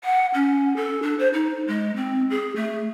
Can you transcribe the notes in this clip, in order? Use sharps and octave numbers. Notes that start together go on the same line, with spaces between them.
F#5
C#4
A4
D4
C5
D#4
G#3
C4
G#4
A3